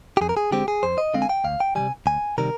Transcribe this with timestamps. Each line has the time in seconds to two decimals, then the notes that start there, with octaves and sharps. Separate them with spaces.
0.17 G4
0.21 F2 G#4
0.29 A#4
0.37 G#4
0.51 D3 G#3 C4 G4
0.68 G#4
0.83 F2 C5
0.98 D#5
1.14 D3 G#3 C4 F5
1.22 G#5
1.29 G5
1.44 D2 F5
1.60 G5
1.75 D#3 G3 G#5
1.80 C3
2.06 D2 G#5
2.38 C3 D#3 G3 A#4